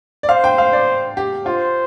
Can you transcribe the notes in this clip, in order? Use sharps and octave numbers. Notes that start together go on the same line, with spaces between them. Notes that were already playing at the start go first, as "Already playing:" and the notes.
D5
C5 F5
G5
F5
D5
G4
F4 C5